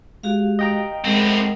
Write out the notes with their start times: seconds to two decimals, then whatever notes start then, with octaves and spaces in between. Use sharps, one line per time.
0.23 G#3 F#4 G4 F5
0.59 D#5 G5 A#5
1.05 A2 G#3 C4 A#4 F#5